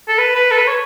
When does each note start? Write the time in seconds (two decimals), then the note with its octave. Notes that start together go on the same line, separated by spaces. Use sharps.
0.08 A4
0.18 B4
0.35 B4
0.51 A4
0.58 B4
0.68 C#5